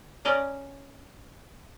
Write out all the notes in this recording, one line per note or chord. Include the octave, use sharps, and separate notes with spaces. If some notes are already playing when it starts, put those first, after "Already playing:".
C#4 D5 D#5 A#5